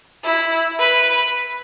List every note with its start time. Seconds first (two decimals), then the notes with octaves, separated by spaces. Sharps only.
0.24 E4
0.79 B4